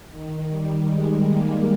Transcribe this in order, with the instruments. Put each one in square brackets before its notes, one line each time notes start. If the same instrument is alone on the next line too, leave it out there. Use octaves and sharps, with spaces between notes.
[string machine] D#3
G3
G#3
A#3